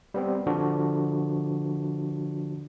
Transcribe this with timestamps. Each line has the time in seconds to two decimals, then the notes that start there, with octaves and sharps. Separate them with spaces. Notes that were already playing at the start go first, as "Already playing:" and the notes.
0.14 G3 B3 C4
0.47 D3 F3 D4 F#4